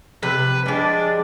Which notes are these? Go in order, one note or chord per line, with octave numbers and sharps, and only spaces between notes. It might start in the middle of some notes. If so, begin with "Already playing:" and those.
C3 F3 B4
G3 G#3 D4